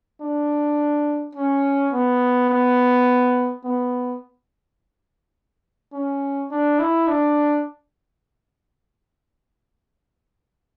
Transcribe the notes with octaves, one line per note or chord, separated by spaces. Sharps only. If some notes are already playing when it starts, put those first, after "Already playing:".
D4
C#4
B3
B3
B3
C#4
D4
E4
D4